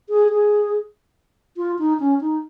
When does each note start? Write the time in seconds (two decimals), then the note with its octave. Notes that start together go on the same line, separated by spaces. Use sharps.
0.09 G#4
0.30 G#4
1.57 F4
1.79 D#4
2.00 C#4
2.21 D#4